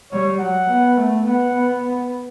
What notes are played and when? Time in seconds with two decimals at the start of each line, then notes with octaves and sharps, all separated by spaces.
0.12 G3 C#5
0.39 F#3 F#5
0.68 B3
0.97 A3
1.25 B3 F#5
1.54 B3